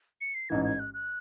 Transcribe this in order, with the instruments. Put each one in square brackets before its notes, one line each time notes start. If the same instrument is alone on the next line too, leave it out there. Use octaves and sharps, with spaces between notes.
[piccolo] C#7
C7
[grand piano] A1 G#2 E3 [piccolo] G#6
[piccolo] G#6
F#6
F#6